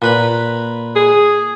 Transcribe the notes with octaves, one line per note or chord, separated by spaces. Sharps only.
A#2 B4 B5
G#4